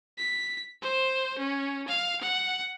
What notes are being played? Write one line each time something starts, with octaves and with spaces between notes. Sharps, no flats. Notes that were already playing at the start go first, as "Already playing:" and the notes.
B6
C5
C#4
F5
F#5